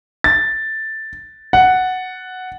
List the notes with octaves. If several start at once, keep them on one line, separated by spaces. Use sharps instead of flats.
A6
F#5